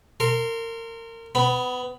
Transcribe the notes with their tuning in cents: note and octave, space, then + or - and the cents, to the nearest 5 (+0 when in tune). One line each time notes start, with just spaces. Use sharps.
A#4 -30 C6 +0
B3 +25 B5 +0